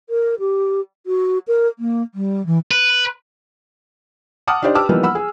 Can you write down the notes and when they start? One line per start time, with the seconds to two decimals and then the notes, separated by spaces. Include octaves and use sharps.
0.09 A#4
0.39 G4
1.06 F#4
1.47 A#4
1.79 A#3
2.14 G3
2.46 E3
2.71 B4
4.47 F#5 A5 D6 D#6 F6
4.62 D4 D#4 G4 C5 D5
4.75 G4 B4 A5 D6 E6 F6
4.89 E3 F3 G3 A#3 B3 D#4
5.03 F#5 B5 E6
5.15 G#4